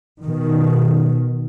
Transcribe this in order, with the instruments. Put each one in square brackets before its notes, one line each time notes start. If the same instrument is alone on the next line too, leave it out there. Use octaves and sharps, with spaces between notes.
[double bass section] B2 D#3